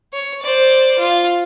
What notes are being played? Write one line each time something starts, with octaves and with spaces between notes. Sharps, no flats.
C#5
C5 D5
F4